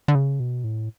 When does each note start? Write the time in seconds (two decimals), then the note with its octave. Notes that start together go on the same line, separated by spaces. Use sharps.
0.08 D3
0.15 C#3
0.40 B2
0.64 A2